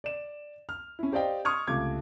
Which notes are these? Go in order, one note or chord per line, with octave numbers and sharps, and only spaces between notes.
D5 E7
F6
C#4 E4
G4 C5 D5 D#5 F5 G5
C6 C#6 D#6 F6 G#6
C#2 C3 A3 D6 G#6